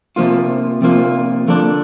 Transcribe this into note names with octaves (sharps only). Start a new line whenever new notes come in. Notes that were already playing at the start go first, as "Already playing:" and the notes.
C3 F3 A#3 F4
C3 F3 A#3 F4
D3 F3 A#3 D4